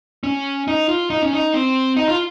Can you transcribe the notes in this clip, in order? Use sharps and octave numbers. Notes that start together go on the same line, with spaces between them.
C#4
D#4
F4
D#4
C#4
D#4
C4
D#4
F4